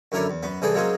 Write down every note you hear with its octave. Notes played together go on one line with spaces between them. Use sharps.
F#2 D3 E4 A#4 C#5 D5
E2
F#2 B3
C2 E3 G#4 A4 D5 G5
F#3 G#3 A#3 C4 C#4 G#4